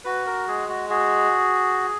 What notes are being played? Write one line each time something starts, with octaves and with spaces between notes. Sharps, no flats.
F#4 B4
A#4
G#3 G#4
F#4
F#4 G#4